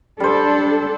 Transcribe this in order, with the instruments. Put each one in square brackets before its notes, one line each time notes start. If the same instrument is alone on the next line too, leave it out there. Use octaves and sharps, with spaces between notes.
[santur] G3 C5 [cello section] D4 A4